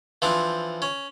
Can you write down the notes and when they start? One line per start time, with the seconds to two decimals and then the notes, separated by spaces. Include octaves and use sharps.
0.22 E3 F3 C4 D4
0.82 C#4